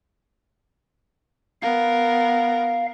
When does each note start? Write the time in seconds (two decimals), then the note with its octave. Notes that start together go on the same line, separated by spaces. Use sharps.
1.62 B3 A#4 F5